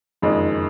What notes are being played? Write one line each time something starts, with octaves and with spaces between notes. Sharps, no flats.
F#1 F2 D#3 G#3